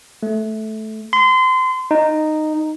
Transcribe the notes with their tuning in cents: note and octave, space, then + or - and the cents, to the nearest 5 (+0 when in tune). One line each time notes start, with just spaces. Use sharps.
A3 -15
C6 -30
D#4 -10